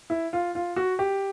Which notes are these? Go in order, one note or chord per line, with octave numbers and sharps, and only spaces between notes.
E4
F4
F4
F#4
G4